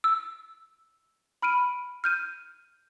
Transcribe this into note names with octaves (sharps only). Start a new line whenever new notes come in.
E6
B5 F6 D7 D#7
F6 G6 D#7